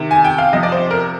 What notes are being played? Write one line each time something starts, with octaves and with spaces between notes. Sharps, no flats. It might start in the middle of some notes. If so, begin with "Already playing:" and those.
Already playing: C3 D#3
G#5
G5
F5
C3 F3 D#5
D5
C5
A#4